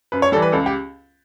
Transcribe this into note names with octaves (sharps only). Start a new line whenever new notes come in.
F#2 B4
C#5
E3 G3 A4
B4
C#2 A4
G4